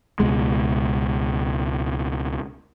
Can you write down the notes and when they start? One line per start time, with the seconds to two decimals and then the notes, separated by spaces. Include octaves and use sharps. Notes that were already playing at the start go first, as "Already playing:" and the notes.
0.20 C#2 B2 G#3